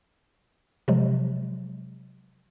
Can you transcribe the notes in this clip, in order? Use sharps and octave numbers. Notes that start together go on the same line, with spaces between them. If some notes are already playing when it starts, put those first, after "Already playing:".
C3 F3 F#3 G#3